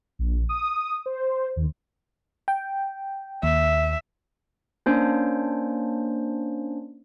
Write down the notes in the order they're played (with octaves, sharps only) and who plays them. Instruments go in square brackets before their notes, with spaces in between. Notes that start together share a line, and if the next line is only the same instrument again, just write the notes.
[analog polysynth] A#1
D#6
C5
D#2
[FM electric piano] G5
[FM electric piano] D#2 [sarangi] E5
[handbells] A#3 C#4 D4 C5